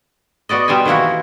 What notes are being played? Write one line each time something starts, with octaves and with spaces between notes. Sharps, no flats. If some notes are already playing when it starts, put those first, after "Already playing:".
B3 F#4 D5 D#5
B2 G3 C5 G5 G#5
D#3 E3 A#3 E4 F#4